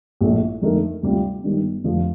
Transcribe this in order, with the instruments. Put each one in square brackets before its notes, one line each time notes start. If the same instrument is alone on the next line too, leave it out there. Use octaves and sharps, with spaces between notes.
[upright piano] A#1 A2 A3 D4
F2 D3 A3 D#4 A#4
D2 C3 G3 D4 F4
G1 G2 D#3 G3 D4
F1 F2 D3 F3